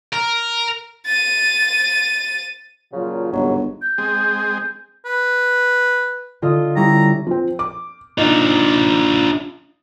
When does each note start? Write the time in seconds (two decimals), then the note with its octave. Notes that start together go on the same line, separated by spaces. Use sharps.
0.13 A#4
1.05 A6 D#7
2.92 A#2 C#3 F3 F#3
3.32 G1 D#2 G#2 C#3 F#3
3.82 G6
3.98 G#3 C4 G#4
5.05 B4
6.42 D3 F4 D#5
6.76 G3 C#4 E4 A#5
7.27 F3 C4
7.59 D6
8.18 D4 D#4 F4